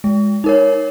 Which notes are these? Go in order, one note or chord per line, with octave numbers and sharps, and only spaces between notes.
G#3
D#4 A#4 C#5